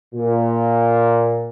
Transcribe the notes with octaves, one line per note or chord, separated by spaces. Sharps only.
A#2